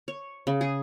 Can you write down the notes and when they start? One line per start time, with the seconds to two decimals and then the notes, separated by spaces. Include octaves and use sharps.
0.08 C#5
0.47 C#3
0.61 G#4